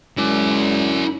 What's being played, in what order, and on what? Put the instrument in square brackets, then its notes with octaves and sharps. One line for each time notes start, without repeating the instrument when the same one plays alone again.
[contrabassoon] F#2 [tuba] G#3 [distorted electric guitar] E4 D5